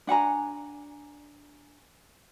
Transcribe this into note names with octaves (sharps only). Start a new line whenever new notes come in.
D4 F#5 G#5 A#5